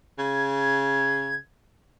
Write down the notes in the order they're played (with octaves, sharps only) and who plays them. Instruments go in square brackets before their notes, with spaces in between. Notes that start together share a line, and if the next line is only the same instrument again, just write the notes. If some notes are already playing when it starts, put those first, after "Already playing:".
[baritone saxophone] C#3 [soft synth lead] G#6